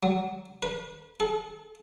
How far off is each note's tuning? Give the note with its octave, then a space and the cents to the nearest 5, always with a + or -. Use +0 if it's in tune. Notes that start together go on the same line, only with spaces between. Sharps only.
F#3 +10
B4 -25
A4 -45